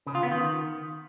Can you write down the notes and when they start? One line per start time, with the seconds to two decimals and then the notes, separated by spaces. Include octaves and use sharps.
0.07 C#3
0.15 F4
0.23 B3
0.31 D#3